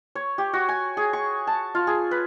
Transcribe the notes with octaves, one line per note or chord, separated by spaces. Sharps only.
C#5
G4
F#4
G#5
G#4
C#6
A5
F4
G#4
B4